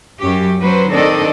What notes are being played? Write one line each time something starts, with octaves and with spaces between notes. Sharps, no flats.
F#2 C#4 G4
F#3 B4 C5
D#3 C4 D4 A4 D5 D#5